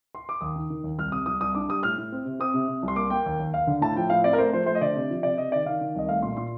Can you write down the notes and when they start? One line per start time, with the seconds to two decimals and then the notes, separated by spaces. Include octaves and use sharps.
0.15 C6
0.29 D6
0.41 D#2 D#6
0.56 D#3
0.70 D#3
0.84 D#2
0.98 C2 F6
1.12 C3 D#6
1.26 C2 D#6
1.40 C2 D#6
1.55 D4 D6
1.69 G3 D#6
1.83 A2 F6
1.98 A2
2.12 C4
2.25 C3
2.39 C4 D#6
2.54 C3
2.68 C3
2.82 C2
2.88 C6
2.96 A#3 D6
3.10 A#3 G5
3.26 D#2
3.39 D#2
3.53 D#2 F5
3.67 D3
3.81 A2 A5
3.96 F3 G5
4.10 A2 F5
4.24 C4 D5
4.33 A#4
4.38 A3 C5
4.53 F3 C5
4.66 A3 C5
4.75 D#5
4.81 D3 D5
4.96 C3
5.10 F3
5.23 C3 D5
5.38 C3 D#5
5.52 D#3 D5
5.66 D#3 F5
5.81 D#3
5.95 C2 D#5
6.09 A3 F5
6.22 A#2 C6
6.37 A#2 C6